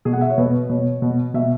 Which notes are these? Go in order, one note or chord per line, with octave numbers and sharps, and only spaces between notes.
B2 G#4
F#5
E5
C#5
B2 B4
B2 C#5
B2
B2 E5